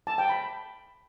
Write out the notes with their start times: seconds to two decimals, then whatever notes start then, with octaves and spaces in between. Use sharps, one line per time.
0.07 A5
0.18 G5
0.29 B5